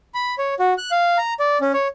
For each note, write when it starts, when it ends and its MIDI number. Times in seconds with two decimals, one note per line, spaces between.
0.14 0.35 83
0.38 0.54 73
0.59 0.73 66
0.78 0.91 90
0.91 1.18 77
1.18 1.34 82
1.40 1.58 74
1.61 1.72 61
1.73 1.88 73